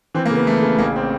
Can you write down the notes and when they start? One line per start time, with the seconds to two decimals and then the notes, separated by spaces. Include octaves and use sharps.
0.15 E3 C4
0.26 A#3
0.31 C#3 B3
0.47 E3 A3
0.62 C#3
0.79 A1 A#3
0.96 C4